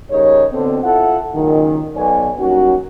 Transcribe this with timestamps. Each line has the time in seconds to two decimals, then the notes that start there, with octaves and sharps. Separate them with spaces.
0.11 C#3 G3 D#4 A#4 C#5
0.52 B2 D3 C4
0.83 E4 F4 A4 F#5
1.34 C#2 F#2 A#2 D#3
1.96 B1 F#3 B3 C#5 D5 G#5
2.38 F#3 G3 A#3 C#4 D#4 F#4